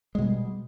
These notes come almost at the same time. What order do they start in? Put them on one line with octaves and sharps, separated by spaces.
G#3 B2 G3